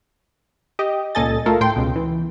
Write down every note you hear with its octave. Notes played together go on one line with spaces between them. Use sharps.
G4 D#5
C#2 A#2 A4 D#5 G#5 A6
A3 F4 A4 A#4
A2 G5 C6
C#2 B2
E3